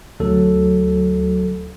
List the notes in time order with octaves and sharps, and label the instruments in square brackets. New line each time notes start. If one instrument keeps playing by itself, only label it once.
[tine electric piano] D2 F#3 A4